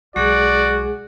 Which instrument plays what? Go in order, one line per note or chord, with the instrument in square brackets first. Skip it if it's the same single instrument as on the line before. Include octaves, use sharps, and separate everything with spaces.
[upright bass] B1 [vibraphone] G#3 G#4 [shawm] F#4 [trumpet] D5